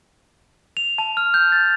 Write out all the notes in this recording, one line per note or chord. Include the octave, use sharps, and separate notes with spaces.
F7
A5
F6
G6
A6